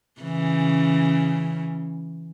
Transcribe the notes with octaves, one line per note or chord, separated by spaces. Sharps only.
C#3 E3 C#4